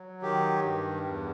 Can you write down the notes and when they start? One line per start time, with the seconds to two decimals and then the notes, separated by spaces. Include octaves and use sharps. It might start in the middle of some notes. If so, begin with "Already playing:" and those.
Already playing: F#3
0.22 D#3 G4
0.64 G2
1.07 E2